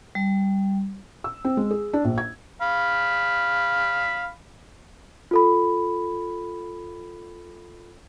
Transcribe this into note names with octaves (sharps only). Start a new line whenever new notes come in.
G3
E6
C4
G#3
G#4
D4
A#1
G#6
F5 B5
F4 A4 B5